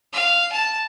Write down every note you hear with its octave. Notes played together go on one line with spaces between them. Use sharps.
F5
A5